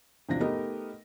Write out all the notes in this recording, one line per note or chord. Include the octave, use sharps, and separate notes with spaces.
E2 C3 F3 D4 A#6
A3 B3 D#4 G4 A#4 D#5